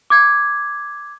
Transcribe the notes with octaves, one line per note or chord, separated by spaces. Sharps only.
D6 G#6